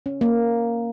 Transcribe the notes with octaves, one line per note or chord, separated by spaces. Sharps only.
C#4
A#3